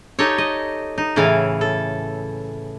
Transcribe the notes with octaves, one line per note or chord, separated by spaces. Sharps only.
D#4 G4 A4 C#5
D#5
D#4
A2 C#3 E3 E4 F5
A4